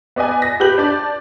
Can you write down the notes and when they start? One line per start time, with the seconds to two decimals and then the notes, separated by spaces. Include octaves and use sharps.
0.16 B3 D5 D#5 G#5
0.42 A#6
0.60 G4 B4 G6 F#7
0.78 D4 D5